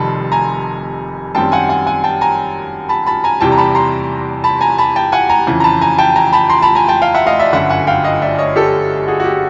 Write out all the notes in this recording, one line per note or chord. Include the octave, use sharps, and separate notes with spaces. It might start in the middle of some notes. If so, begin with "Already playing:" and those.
Already playing: F1 F2 C3 D#3 G3 A5 B5 C6
G#5 A#5
F#2 D#3 G3 C4 G5 A5
F#5 G#5
F#5 G#5
F#5 G#5
G5 A5
G#5 A#5
A5 B5
A5 B5
G#5 A#5
E2 C3 E3 G3 G5 A5
A#5
A5 B5
A#5 C6
A5 B5
G#5 A#5
A5 B5
G5 A5
F#5 G#5
G#5 A#5
F2 C#3 E3
A#5
A5 B5
G#5 A#5
G5 A5
G#5 A#5
A5 B5
A#5 C6
A5 B5
G#5 A#5
G5 A5
F5 G5
E5 F#5
D#5 F5
D5 E5
G1 F#2 D3 E5 F#5
F#5 G#5
F5 G5
D#5 F5
D5 E5
C#5 D#5
G4 A4
F#4 G#4
F#4
G4